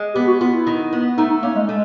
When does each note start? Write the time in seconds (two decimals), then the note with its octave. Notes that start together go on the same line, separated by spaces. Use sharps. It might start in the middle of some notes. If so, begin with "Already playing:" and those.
Already playing: G#3
0.15 B3 G4
0.28 F#4
0.41 B3 F4
0.53 E4
0.67 D#3
0.93 B3
1.18 A3 D#4
1.30 D#4
1.43 A#3 C#4
1.56 G#3
1.68 G#3 A3